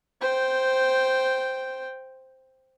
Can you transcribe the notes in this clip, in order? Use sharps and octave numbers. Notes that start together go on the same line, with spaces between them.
C5 G5